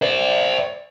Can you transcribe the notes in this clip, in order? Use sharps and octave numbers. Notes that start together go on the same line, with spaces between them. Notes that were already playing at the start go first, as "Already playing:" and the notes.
C5 D5